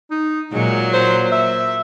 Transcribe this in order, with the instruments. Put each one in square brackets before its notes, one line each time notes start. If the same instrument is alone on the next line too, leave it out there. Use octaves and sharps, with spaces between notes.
[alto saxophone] D#4
[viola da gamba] A#2 F#3 [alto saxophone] G#3
[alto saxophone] C5
E5